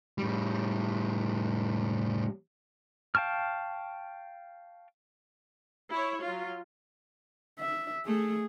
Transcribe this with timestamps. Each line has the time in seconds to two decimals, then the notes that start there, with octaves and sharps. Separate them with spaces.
0.18 A2 G3
3.15 F5 G5 A5 C#6 F6
5.90 E4 C#5
6.22 F#3 F4
7.60 E5
8.06 A3 G#4